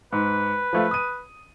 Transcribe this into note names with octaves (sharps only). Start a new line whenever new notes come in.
G#2 B4
F3 A3 F5
D#6 D#7